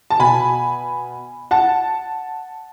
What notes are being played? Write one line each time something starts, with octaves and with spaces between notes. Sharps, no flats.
A5
B2 G#5 B5
F#5 A5